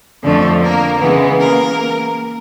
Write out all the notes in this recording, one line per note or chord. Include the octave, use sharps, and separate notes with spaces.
F2 D3 F3 A3 A4
A#3 A#4
C#3 E3 G#3 B3 B4
A#3 A#4